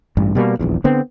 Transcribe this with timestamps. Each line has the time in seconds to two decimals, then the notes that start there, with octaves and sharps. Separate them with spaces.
0.17 A1 G2
0.35 B2 G3 A#3
0.59 D#1 A#1 E2
0.84 D3 B3 C4